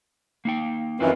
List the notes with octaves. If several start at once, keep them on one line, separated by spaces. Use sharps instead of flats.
A#3 D#4 G5
F#2 D#3 E3 C4 E4 F4